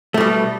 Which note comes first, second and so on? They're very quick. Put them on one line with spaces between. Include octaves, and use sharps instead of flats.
A3 B2 G3